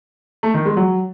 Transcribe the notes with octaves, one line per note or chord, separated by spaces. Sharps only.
A3
D#3
G#3
F#3